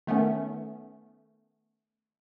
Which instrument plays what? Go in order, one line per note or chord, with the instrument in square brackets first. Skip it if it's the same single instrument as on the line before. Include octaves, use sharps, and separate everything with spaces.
[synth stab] D#3 A3 B3 C#4